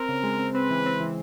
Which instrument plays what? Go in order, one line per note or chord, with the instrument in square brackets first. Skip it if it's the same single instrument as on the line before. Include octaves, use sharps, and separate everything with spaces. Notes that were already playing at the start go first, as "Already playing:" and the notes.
Already playing: [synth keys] C4 [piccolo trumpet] A#4
[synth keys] C#3
G#3
C4
[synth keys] C4 [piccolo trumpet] B4
[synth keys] E3
C4
E3